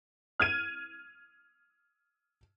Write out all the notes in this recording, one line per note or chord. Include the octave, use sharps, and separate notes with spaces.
F6 G#6 D#7